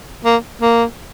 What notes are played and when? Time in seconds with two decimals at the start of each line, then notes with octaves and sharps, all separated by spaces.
0.25 A#3
0.62 A#3